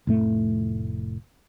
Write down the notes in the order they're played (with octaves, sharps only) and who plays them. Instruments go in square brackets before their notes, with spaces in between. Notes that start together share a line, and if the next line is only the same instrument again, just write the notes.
[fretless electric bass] F1 A2 A3